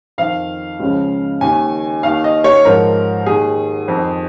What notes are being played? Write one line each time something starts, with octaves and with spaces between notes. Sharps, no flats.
F2 D#3 F5
C#2 C#3 F3
D#2 D#3 G#5
D#2 D#3 F5
D#5
C#5
G#2 F3 A#4
D#2 D#3 G#4
F2 D#3